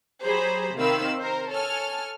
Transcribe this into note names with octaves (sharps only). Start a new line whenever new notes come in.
F#3 G4 G#4 C5 A#5 B5
C3 D#3 C4 F5 B5 E6
A#4 C5
A4 C#5 G#5 F6